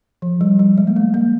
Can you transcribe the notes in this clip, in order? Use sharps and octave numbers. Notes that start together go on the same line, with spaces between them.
F3
G3
G3
G#3
A#3
A3
A#3